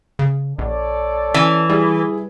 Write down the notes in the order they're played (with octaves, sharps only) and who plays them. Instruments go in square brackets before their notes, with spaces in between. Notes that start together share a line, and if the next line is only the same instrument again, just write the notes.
[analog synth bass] C#3
[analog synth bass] A#1 [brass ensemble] A4 C#5 D5
[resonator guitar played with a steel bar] E3 [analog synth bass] C#4
[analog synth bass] G3 [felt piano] E4 G#4